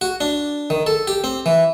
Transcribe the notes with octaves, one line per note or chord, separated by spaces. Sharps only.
F#4
D4
D#3
A4
G4
C4
E3